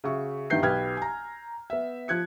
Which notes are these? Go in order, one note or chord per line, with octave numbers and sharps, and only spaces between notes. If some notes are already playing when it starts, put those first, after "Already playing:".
C#3 F#4 E5 C#6
G2 D#3 E3 B3 G6 C7
B1 G4 B4 G5 F6 G#6
G#5 A#5
B3 E5
F3 F#6 G#6 C#7